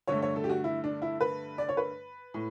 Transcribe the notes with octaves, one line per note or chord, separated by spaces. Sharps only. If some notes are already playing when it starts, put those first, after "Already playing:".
G2 D3 A3 C#5
C#5
A4
G4
F#4
E4
D4
E4
B4
D5
C#5
B4
A2